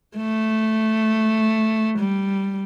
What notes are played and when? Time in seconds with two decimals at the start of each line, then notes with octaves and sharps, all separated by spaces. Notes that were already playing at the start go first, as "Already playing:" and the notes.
0.17 A3
1.99 G3